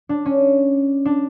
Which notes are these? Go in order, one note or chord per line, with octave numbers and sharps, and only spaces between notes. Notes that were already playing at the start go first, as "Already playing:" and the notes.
D4
C#4
D4